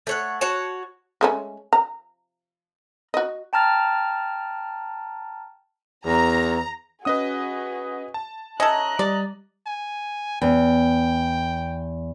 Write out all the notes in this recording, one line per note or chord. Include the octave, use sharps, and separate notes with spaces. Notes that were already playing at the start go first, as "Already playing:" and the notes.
A3 C#5 F#5
F#4 C#5 A5
G#3 A3 C#4
A#5
F#4 D#5
G5 A5 A#5 F6 A6
E2 A#5
C#4 F#4 G#4 B4 D#5 F#5 D#6
A5
C#4 A4 D#5 E5 A#5 F#6
G3 D5
G#5
E2 G5